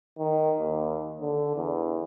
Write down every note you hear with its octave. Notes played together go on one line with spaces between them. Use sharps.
D#3
D#2
D3
E2